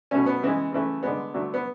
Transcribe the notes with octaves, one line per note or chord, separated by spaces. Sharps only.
B2 A3 C#4
B3
C#3 E3 G#3
C#3 E3 A3
D3 G#3 B3
D3 F#3 A3
B3